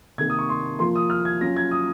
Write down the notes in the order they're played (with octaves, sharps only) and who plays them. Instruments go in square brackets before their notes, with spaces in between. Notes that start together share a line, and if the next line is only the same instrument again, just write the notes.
[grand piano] C3 D#3 A#3 G#6
D#6
C#6
C6
F3 A#3 F4 C6
D#6
F6
G#6
F#3 C#4 F4 A#6
G#6
D#6